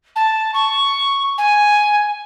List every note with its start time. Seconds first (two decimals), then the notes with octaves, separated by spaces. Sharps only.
0.16 A5
0.54 C#6
1.38 G#5